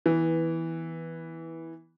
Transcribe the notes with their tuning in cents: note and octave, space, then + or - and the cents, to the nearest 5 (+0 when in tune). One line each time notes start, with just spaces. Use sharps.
E3 -10 B3 +0